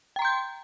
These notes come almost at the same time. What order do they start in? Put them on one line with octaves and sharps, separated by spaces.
G5 A#5 C6 G6